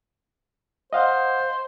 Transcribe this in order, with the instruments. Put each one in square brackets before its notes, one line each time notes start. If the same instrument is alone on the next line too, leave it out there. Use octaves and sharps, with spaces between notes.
[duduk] C5 [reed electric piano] D#5 F5 F#5